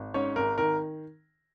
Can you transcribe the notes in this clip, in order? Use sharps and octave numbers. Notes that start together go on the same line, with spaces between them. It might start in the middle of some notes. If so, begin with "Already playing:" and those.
Already playing: G#1
G#2 C#4 C#5
G#1 A#4
D#3 A#4